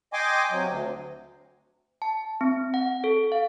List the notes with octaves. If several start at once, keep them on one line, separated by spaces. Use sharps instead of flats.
D#5 G5 G#5 C6 D6
C3 F#3
D2
A5
C4
F#5
A4
F5